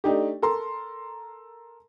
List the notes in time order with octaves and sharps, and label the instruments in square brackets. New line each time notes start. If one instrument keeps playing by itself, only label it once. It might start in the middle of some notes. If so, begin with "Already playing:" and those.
[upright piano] A3 D4 D#4 G4
A4 A#4 A#5 C6